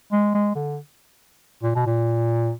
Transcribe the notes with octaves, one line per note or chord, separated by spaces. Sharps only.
G#3
G#3
D3
A#2
B2
A#2